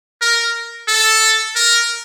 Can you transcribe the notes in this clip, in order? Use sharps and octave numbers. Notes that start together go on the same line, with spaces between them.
A#4
A4
A#4